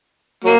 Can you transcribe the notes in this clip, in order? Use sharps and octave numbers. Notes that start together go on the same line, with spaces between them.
F#3 A#3